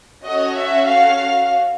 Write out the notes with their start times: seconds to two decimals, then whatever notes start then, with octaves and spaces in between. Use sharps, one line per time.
0.23 C#4 F#4 A4 D#5
0.56 E5
0.89 F5